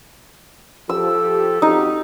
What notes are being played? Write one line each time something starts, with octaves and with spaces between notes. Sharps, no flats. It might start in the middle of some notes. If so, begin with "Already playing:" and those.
F3 G4 A4 E6
F2 D#4 F#4 G4